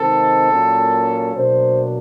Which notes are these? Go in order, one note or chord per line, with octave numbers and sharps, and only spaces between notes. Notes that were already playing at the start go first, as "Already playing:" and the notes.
Already playing: C3 D#3 G#3 C4 A4
A#2 F#3 A#3 C#4
B2 F#3 A#3 D4 C5